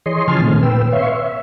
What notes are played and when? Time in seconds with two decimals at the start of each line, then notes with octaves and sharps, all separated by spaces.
0.06 E3 G#4 C#5 D#5 C6
0.28 C#3 F3 G#5 A5 C6 F6
0.41 A#2 D#3 A3 C4
0.63 A#2 B4 G5 E6
0.92 B4 C#5 E5 F5 C6 C#6
1.12 E5